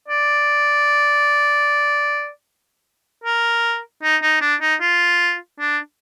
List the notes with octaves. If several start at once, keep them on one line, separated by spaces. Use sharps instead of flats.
D5
A#4
D#4
D#4
D4
D#4
F4
D4